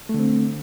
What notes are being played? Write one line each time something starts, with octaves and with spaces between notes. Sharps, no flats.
D3 A3 C4